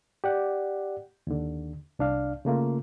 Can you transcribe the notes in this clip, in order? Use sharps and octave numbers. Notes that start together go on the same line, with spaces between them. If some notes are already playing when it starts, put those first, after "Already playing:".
G4 D5 F#5
D#2 D3
C2 D4 F5
C#3 A3 A#3 F4